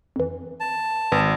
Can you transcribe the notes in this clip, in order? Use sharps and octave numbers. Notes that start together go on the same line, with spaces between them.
F2 E3
A5
G#1 E3